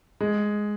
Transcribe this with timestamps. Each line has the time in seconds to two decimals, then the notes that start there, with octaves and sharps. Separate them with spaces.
0.21 G#3